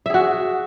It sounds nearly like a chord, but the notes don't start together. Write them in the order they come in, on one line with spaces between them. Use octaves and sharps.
E5 G#4 F#4